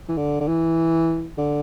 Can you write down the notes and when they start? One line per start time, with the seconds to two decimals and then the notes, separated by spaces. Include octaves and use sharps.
0.09 E3
0.17 D3
0.40 D3
0.48 E3
1.38 D3